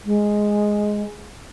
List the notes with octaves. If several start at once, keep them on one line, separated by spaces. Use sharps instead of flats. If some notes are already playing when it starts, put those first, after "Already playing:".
G#3